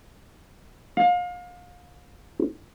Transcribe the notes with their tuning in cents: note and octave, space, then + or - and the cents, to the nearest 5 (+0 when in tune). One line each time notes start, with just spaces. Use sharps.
F5 +30